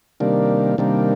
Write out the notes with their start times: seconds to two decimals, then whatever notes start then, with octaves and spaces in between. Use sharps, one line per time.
0.20 C3 D#3 G3 A#3 D4
0.78 C3 D#3 G3 A#3 D4